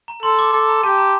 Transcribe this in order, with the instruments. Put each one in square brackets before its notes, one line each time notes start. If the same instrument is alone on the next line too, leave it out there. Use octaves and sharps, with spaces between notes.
[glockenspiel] A#5
[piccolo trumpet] A4 [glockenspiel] C6
[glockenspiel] D6
[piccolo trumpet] A4 [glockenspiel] D6
[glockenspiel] A#5
[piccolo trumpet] G4 [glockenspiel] A5
[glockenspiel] A#5